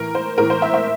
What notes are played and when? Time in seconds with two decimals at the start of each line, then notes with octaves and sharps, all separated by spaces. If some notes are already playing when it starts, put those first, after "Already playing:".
Already playing: A2 E3 A#4
0.15 C5
0.38 A2 E3 A#4
0.50 C5
0.62 E5
0.74 E5